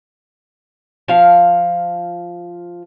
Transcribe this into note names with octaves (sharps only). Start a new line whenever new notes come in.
F3 F5